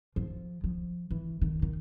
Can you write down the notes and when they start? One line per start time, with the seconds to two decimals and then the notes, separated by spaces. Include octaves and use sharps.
0.16 F3
0.64 F3
1.11 E3
1.41 D#3
1.62 D#3